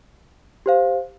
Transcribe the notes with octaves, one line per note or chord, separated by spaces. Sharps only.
G4 C5 F5